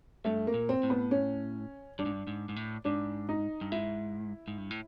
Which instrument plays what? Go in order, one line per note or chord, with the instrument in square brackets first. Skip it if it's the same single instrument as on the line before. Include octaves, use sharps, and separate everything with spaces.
[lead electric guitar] G2 [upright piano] A3
[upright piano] A#3
[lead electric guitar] A#2
[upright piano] C4
[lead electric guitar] A2
[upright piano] B3
C#4
[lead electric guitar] G2 [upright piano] D4
[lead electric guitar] G#2
G2
G#2
G#2
A2
[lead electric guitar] G#2 [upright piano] D4
[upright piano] D#4
[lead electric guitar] G2
[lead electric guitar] G#2 [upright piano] E4
[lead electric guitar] G#2
G2
A2